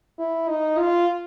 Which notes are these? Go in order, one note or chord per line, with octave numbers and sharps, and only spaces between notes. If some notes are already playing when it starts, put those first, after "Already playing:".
E4
D#4
F4